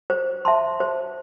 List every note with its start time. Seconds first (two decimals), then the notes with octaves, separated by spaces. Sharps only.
0.10 C5
0.45 E5 A5 C6
0.80 C5